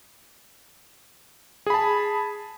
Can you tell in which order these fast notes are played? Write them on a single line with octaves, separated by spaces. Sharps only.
G#4 B5 A5